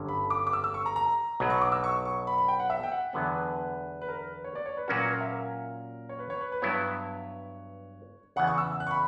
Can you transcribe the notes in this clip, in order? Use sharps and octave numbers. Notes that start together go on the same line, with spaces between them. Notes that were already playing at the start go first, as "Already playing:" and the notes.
Already playing: G1 G2 D3 F#3 C#4
B5
D6
D6
E6
E6
C#6
A#5
A#5
B1 B2 F#3 B5
C#6
D6
E6
C#6
C#6
B5
B5
G5
F#5
E5
G5
F#5
E2 D3 F#3 B3 B4
B4
B4
A#4
B4
C#5
D5
C#5
B4
A#2 F#3 A#3 C#4 F#4 A#4
A#4
E5
A#4
C#5
B4
C#5
B4
B4
G2 F#3 B3 E4 C#5
E2 C#3 E3 B3 F#5
C#6
E6
F#6
C#6
B5